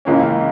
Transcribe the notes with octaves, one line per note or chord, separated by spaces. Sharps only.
C#2 C#3 E3 A#3 C#4